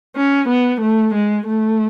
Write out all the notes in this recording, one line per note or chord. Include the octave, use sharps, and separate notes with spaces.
C#4
B3
A3
G#3
A3